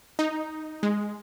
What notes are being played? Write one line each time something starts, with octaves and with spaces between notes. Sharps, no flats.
D#4
G#3